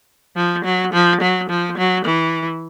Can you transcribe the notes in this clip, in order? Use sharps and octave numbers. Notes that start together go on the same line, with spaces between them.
F3
F#3
F3
F#3
F3
F#3
E3